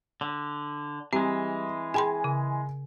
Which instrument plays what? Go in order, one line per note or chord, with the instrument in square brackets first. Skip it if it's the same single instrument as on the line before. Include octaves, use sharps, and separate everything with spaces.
[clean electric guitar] D3
[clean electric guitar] E3 G#3 [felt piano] G3 [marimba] C4
[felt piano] G#4 G#5 [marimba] G5 B5 C6
[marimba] C#3